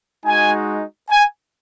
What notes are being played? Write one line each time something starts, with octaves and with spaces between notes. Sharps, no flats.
G#3 D#4 F#4 G#5
G#5